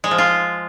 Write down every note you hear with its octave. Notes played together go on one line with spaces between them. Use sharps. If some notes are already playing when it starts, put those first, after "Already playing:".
G#3
F3
F4